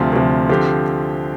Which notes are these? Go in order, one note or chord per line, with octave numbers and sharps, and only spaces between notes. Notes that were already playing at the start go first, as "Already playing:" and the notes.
Already playing: D2 C3 F3
D2 C3 F3
D3 F3 C4 G4